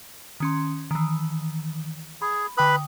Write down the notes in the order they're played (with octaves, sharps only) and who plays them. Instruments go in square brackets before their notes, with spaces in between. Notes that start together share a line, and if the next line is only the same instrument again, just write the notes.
[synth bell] D#3 C#4 C6
D#3 E3
[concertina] G#4 [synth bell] B5
[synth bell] D3 G5 D#6 [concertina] B4 B5